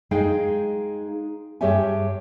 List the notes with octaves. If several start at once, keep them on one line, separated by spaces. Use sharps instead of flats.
G#3 D#4 G#4 D#5 F5 G5
G2 G4 G#4 C#5 E5 G#5